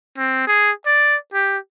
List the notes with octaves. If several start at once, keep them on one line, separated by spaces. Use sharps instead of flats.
C4
G#4
D5
G4